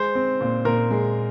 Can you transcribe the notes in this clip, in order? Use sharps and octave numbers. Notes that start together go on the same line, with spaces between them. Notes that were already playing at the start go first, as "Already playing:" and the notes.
Already playing: G#3 C5
C4
A#2
A#2 A#4
G#3